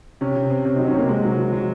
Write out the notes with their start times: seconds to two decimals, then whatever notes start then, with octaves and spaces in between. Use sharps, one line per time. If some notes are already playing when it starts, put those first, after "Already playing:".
0.21 C3 C#4
0.36 C3
0.50 C4
0.65 C3 C#4
0.76 F#3 D#4
0.87 C#4
0.94 C3 A#3
1.09 C3 G#3
1.24 F#3
1.38 F#3
1.53 F#3